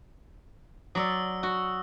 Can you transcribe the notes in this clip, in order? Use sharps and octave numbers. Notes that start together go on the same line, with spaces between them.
F#3 D5 D#6 E6
F#4